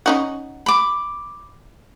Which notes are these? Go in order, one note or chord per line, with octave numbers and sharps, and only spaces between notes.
C#4 D#4 F#4
B5 D6